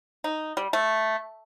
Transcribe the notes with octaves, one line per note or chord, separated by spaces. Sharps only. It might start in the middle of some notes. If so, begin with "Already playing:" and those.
D#4
G3
A3